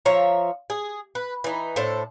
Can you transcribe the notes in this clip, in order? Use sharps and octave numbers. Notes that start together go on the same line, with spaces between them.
F3 C#5 E5 A#5
G#4
B4
E3 D#4
A2 D4 A4 C5